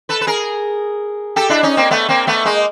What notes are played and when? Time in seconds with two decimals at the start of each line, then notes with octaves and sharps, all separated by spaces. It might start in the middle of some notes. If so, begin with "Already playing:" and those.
0.09 A4 B4
0.21 B4
0.27 G#4 A#4
1.36 G4 A4
1.49 D4 E4
1.63 C#4 D#4
1.77 A#3 C4
1.91 A3 B3
2.08 A#3 C4
2.27 A3 B3
2.45 G#3 A#3